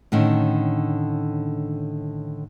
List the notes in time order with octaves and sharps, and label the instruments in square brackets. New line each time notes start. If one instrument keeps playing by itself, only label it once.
[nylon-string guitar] A2 D3 D#3 C#4